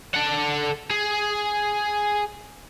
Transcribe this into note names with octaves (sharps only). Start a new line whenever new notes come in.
A4 F#5
G#4